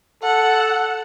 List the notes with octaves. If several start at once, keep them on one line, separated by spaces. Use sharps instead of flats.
A4 F#5